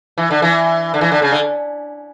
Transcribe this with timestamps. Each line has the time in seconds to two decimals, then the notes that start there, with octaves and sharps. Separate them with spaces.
0.18 E3
0.31 D3
0.42 E3
0.94 D3
1.01 E3
1.12 D3
1.22 C#3
1.32 D3